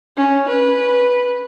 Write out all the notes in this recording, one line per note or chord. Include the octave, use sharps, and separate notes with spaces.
C#4
B4